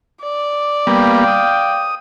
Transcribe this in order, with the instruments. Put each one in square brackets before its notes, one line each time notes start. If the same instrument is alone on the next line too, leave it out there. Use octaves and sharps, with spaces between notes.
[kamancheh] D5
[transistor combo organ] G3 A#3 B3 [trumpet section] F5 G5
[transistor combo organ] D#6